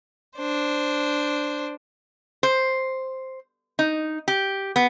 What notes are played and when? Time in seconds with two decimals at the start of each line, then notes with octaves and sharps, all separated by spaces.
0.37 D4 C5
2.43 C5
3.79 D#4
4.28 G4
4.76 B3